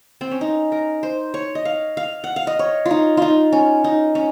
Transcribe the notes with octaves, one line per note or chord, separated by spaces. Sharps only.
C4
C#4
D#4
A#4
C5
C#5
D#5
F5
F5
F#5
F5
D#5
C#5
F4
D#4
D#4 F4
C#4
D#4
C#4